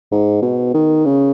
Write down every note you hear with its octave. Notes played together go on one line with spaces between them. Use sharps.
G#2
B2
D#3
C#3